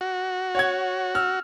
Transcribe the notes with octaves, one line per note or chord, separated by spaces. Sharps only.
F#4
C#5 F#5 G#6
E6 F6